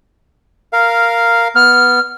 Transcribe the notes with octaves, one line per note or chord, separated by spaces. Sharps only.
A#4 F5
B3 F6